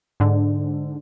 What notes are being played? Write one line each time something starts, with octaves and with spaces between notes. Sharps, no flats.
G#2 D3